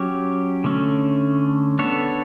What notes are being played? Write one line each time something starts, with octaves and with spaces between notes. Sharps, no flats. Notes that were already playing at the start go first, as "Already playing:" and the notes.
Already playing: F#3 C#4 G4 C#5
D3 A3 C#4
B3 D4 A4 C#5